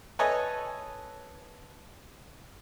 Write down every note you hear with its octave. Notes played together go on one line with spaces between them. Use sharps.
A4 B4 C#5 D#5 G#5